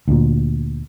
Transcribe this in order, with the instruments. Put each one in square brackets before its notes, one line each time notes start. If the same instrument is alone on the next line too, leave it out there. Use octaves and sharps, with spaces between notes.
[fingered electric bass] D2 A#2